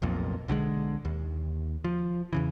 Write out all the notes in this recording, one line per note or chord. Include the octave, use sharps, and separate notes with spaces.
F1 B1 F2 A#2
B1 D3 D#3 G#3
D#2
F3
E2 C#3 E3